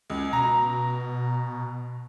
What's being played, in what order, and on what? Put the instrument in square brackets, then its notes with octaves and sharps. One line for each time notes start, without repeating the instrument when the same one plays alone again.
[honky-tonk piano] C#2
[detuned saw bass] B2 [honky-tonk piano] A#5